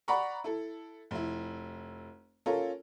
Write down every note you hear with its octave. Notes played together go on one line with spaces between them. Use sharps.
D5 F#5 A#5 B5 C#6
E4 A4
F1 E4
C#4 F4 A4 A#4 C#5